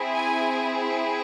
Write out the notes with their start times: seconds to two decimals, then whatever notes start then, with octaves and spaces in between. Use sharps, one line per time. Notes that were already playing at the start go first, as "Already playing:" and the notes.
Already playing: C4 E4 G#4
0.11 G#5